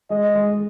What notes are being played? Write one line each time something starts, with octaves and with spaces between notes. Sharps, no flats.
G#3 D#5
G#3